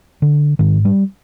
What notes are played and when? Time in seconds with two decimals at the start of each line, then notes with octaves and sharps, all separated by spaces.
0.22 D3
0.59 G#2 D#3
0.85 G3